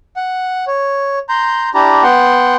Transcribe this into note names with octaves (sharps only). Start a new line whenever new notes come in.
F#5
C#5
A#5 C6 G6
D4 E4 G4 A#5
B3 F#5 G5 C6